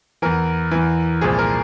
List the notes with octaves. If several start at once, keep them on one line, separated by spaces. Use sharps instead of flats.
E2 E3 A#4
E2 E3
C2 A#2 F3 G#4
A#4